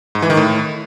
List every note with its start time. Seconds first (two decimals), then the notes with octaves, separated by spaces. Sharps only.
0.15 G#2
0.22 E3
0.30 D#3
0.37 A2